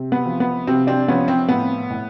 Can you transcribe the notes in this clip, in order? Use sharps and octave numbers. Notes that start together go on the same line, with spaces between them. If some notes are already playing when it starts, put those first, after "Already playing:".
Already playing: C3
B3
F3
B3
C3 C4
C4 D4
F3 B3 C#4
C4
A2 B3
A2